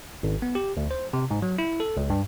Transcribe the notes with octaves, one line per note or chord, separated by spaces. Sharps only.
G#1
B3
G4
D2
C5
C3
G#2
F#3
E4
A4
C#2
G2